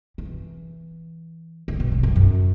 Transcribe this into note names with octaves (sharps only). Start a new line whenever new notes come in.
D3
E3
D3
B2
A2
F#2
F#2